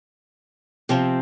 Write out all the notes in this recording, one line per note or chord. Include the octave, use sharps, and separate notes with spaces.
C3 F3 C4